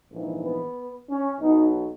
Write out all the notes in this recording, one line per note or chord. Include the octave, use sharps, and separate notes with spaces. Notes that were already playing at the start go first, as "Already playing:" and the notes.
A#1 G#2 E3
B3
C#4
B1 B2 F#3 D#4